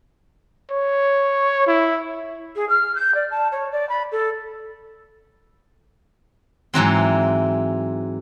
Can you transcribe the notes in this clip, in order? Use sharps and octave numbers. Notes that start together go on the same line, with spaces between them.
C#5
E4
G#4
F6
G6
D5
A5
C#5
D5
B5
A4
G#2 E3 F#3 C4